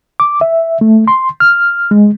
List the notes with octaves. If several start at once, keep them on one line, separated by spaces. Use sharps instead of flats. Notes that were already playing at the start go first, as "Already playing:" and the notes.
D6
E5
A3
C6
F6
G#3